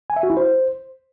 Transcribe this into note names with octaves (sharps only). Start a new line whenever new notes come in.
G#5
E5
F#4
E4
C5